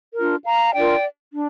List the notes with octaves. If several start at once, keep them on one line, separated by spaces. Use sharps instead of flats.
D4 F4 A#4
F5 A#5
D4 F4 A#4 D5 G5
D4